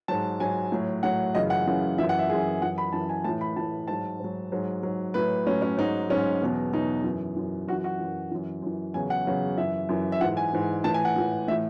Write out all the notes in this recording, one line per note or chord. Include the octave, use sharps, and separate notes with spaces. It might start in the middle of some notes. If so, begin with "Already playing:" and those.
G#2 F#3 A5
G#2 F#3 G#5
A2 F#3
A2 F#3 F#5
F#2 C#3 E3 D#5
F#5
F#2 C#3 E3
F#2 E3 E5
F#5
E5
F#2 E3 G#4
F#2 E3 F#5
B5
F#2 E3 A5
G#5
A2 E3 A5
B5
A2 E3 A5
G#2 F#3 A5
G#2 F#3
G#2 F#3
G#2 F#3
A2 F#3 B4
A2 F#3 C#4
C#4
G#2 F#3 D#4
G#2 F#3 C#4
E2 B2 F#3
E2 B2 F#3 D#4
F#2 E3
F#2 E3
F#2 F#4
E3
F#4
F#2 E3
F#2 E3
F#2 E3
E2 C#3 F#3 G#5
F#5
E2 C#3 F#3
F#2 E3 E5
F#2 E3
E5
G#2 E3 F#5
G#5
G#2 E3
A2 E3 A5
G#5
F#5
A2 E3
A2 E3 E5